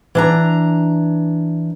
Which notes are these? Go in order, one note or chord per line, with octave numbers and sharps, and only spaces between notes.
E3 D4 A#5